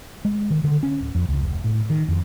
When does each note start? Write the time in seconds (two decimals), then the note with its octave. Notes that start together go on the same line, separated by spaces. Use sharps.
0.25 G#3
0.50 D#3
0.64 D3
0.83 C#4
1.00 D1
1.15 F2
1.29 C#2
1.41 F1
1.64 A2
1.90 D#3
2.08 F2